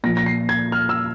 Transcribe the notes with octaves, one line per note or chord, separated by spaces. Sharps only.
A#2 F3 A#6
A#6
C7
G#6
F6
E6